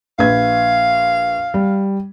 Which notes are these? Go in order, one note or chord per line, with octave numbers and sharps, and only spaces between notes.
A#1 B4 F5 G#6
G3